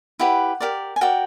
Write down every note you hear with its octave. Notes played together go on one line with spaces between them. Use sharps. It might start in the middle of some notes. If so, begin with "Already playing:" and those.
E4 G4 B4 F#5
G4 A#4 D5
G#5
F#4 A#4 D5 G5